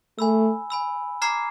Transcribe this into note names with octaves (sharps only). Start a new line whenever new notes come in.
A3 G#5 B5 E6
G#5 B5 E6
A#5 D6 F6 G#6 C7